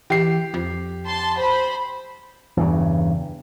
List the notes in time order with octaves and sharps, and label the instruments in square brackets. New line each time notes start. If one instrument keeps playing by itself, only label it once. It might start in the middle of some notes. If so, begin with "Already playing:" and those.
[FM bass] E3 [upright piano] G4 C7
[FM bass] F2
[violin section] A5 C6
C5 B5
[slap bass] E2 G2 C#3